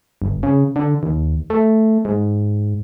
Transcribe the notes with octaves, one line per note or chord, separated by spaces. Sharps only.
G1
C#3
D3
D#2
A3
G#2